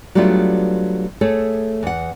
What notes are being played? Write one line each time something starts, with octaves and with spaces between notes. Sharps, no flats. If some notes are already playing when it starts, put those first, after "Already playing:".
F#3 G3 A3 B3 D4 F4
A3 G#4 A4 C#5
E2 F#5